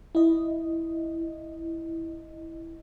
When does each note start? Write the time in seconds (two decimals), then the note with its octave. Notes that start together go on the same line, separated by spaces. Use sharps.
0.15 E4 D#5